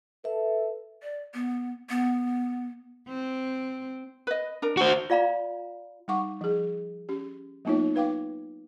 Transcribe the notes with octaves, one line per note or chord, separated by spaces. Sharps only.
A4 B4 E5
D5
B3
B3
C4
B4 D#5
D4 A#4
F#4 C5
F4 D5 F5 A#5 B5
G3 D#4 F#5 C#6 D6
F3 G#4
C#4 G4
F#3 A#3 B3 D#4 F4 C#5
D#4 B4 F5 G5 D6